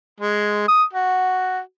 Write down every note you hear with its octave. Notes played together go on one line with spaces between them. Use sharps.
G#3
D#6
F#4